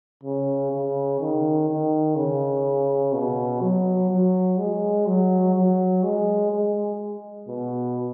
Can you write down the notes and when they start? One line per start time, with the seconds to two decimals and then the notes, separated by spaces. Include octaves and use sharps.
0.23 C#3
0.71 C#3
1.20 D#3
1.68 D#3
2.16 C#3
3.13 B2
3.61 F#3
4.10 F#3
4.58 G#3
5.07 F#3
5.55 F#3
6.03 G#3
6.52 G#3
7.48 B2